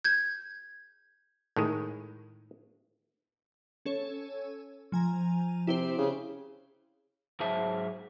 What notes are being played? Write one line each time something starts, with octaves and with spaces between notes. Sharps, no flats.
G6 G#6
A2 D#3 G#3
C#4 A4 C#5
F3 G#5 A#5
C3 E4 G4 C5
C#3
G#2 F#3 G#4 C5 E5 A5